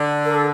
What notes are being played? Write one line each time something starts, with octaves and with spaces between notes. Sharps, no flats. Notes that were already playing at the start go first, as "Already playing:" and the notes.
Already playing: D3
A#4
A4